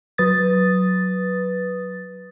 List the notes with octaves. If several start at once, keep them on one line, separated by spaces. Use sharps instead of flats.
F#3 B4 D#6 A6